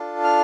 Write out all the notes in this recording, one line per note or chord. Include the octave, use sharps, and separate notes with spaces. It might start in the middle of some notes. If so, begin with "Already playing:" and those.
Already playing: D4 F4 A4
F6